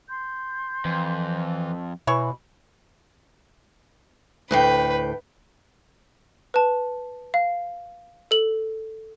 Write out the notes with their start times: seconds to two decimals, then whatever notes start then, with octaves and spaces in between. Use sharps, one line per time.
0.09 C6 G6
0.85 F2 E3
2.07 B2 E3 C#5 B5 C#6
4.51 D2 A2 B4 G5
6.54 B4 A5
7.34 F5
8.31 A4 F#7